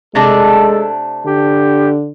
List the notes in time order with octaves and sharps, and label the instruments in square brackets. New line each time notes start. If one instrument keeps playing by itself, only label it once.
[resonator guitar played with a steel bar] C3 A3 D4 [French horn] G#3 [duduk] A4
[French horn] D3 [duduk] G4